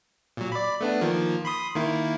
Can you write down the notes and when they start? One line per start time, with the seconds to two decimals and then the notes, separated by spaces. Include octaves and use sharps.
0.37 A#2 F#3
0.52 D5 B5
0.81 A3 B3 D4
1.01 D#3 F3 A#3
1.45 B5 C6 D#6
1.75 D#3 A#3 E4